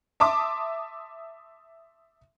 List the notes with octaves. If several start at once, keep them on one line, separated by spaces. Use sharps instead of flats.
E5 A5 C6 D6 D#6